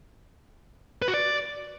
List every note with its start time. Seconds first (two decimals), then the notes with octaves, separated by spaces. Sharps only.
1.02 B4
1.08 F#4
1.14 D5